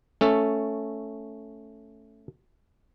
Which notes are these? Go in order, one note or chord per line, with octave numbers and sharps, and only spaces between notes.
A3 C#4 A4